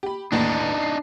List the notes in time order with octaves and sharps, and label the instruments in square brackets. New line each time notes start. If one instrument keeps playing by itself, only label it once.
[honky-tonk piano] G4 B5
[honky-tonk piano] A1 D#2 A2 [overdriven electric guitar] D4 D#4
[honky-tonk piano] C7